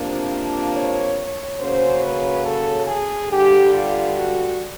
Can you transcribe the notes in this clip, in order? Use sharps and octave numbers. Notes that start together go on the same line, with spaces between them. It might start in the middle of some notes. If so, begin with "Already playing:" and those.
Already playing: C3 F3 A#3 D4
C#5
C#5
C#3 F#3 A#3 C#4 C5
B4
A4
G#4
G2 D3 G3 G4
F4
F#4